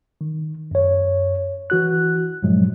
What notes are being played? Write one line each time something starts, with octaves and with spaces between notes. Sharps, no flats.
D#3
F#2 C#5
E3 F#4 F#6
G2 A#2 F3 F#3 G#3